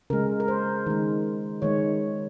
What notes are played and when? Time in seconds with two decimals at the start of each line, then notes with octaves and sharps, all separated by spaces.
0.10 C#3 G#3 A#4
0.40 A#4
0.48 C5
0.86 D#3 G#3
1.62 D#3 G#3 C#5